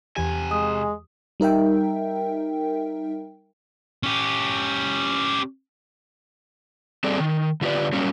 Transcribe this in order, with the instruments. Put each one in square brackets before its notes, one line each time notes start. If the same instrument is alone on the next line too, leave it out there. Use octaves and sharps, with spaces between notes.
[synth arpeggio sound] E2 E3 G4 [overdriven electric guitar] C3 G#5
[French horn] G#3 [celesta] D#6
[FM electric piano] G3 D#4 A#4 E5 G5
[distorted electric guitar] C#4 G4
[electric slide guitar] G3 C4 G#4 A4 D5
D#3
D3 F4 G4 B4 D5
F#3 G3 A#3 C#4